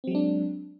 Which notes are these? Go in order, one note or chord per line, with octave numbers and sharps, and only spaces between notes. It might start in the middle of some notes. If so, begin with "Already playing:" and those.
F#3 G#3 C4 D4